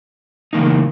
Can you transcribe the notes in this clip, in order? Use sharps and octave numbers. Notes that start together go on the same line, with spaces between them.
C#3 E3 A#3 D#4